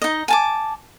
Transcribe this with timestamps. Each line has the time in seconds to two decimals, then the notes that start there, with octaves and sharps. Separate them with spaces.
0.02 D#4 D#5
0.28 G#5 A5 D6